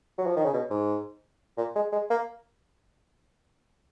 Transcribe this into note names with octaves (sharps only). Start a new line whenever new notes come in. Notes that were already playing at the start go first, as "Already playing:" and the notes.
F#3
F3
D#3
C#3
B2
G#2
A#2
G#3
G#3
A#3